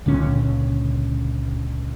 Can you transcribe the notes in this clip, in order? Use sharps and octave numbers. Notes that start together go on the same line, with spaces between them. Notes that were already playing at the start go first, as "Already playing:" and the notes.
C#2 A#2 D3 C#4